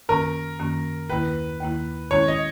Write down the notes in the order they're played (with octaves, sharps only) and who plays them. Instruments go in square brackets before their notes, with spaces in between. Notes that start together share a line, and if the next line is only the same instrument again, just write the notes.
[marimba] F#2 D#3 A#3 C#4 [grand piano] A#4
[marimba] F#2 D#3 A#3 C#4
[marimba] D#2 D#3 A#3 E4 [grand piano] B4
[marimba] D#2 D#3 A#3 E4
[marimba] D#3 G#3 C#4 E4 [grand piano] C#5
[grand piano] D#5